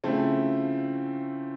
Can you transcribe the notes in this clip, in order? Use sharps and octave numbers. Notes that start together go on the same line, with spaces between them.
C#3 F3 A3 C4 E4